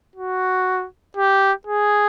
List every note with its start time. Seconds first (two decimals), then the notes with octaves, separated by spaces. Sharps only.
0.16 F#4
1.17 G4
1.67 G#4